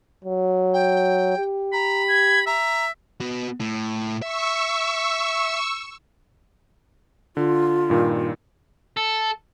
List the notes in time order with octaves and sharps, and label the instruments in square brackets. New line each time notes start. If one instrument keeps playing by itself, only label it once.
[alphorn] F#3
[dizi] G5
[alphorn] G4
[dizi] A#5 [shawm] B5
[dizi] G#6
[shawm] E5 [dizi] A#5
[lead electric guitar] B3 F#4
A2
[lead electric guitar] E5 [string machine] C#6 E6
[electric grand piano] D3 [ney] F4
[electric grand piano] G2 A#2 D#3
[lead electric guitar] A4